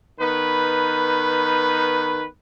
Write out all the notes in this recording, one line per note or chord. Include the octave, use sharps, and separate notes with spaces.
D#3 B3 B4